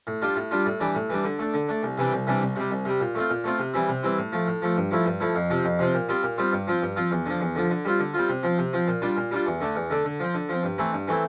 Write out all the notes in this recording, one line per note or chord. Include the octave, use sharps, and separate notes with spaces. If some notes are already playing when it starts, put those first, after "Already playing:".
A2
G3 D4 F4
A2
G3 D4 F4
A2
E3 G3 D4
A2
E3 G3 D4
D3
A3 D4
D3
A3 D4
C2
C3 E3 G3 D4
C2
C3 E3 G3 D4
C2
C3 G3
C2
C3 G3
A#2
A3 C4 F4
A#2
A3 C4 F4
C3
E3 G3 C4 E4
C3
E3 G3 C4 E4
A2
F3 A3
A2
F3 A3
G2
F3 A3 E4
G2
F3 A3 E4
F2
C3 F3 C4
F2
C3 F3 C4
A#2
G3 C4 F4
A#2
G3 C4 F4
G2
F3 C4 F4
G2
F3 C4 F4
E2
D3 F3
E2
D3 F3
D3
G3 C4 F4
D3
G3 C4 F4
C3
F3 C4
C3
F3 C4
A#2
G3 D4 F4
A#2
G3 D4 F4
E2
D3 A3 D4
E2
D3 A3 D4
D3
F3 C4
D3
F3 C4
G2
E3 A3 C4 E4
G2
E3 A3 C4 E4